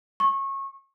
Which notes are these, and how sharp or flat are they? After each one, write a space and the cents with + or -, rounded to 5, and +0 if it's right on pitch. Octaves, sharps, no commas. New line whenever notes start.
C#6 -25